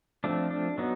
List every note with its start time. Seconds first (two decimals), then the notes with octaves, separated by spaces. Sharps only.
0.24 F3 A3 C4 D4
0.51 D4
0.78 F#3 B3 D#4